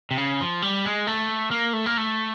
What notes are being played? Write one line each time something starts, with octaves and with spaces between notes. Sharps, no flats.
C3
C#3
F3
G3
G#3
A3
A#3
A3
A#3
A3